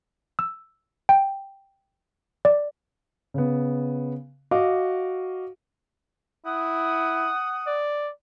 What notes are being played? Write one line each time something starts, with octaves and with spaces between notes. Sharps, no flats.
E6
G5
D5
C#3 B3
F#4 D#5 F5 D6
E4 F#5 D#6
D5